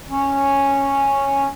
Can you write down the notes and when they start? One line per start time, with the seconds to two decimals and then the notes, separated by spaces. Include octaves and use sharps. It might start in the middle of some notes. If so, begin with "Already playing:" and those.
0.10 C#4